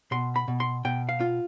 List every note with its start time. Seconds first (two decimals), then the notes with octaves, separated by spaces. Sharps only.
0.11 B2 C6
0.36 B5
0.48 B2
0.60 C6
0.85 B2 G5
1.09 F5
1.21 F4